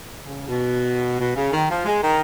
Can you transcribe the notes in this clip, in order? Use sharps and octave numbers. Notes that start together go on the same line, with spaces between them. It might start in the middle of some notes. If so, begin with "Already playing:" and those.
C#3
B2
B2
C#3
D#3
F3
G#3
D#3